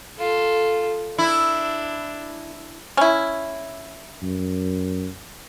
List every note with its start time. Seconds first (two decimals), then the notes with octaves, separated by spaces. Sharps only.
0.18 F4 A4
1.18 D4 E4
2.97 C#4 E4
4.22 F#2